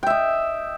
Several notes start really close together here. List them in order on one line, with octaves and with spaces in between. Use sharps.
G5 E5 D#5